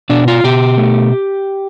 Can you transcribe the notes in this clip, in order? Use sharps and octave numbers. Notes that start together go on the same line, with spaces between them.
B2 D4
F4
B2 G4
A3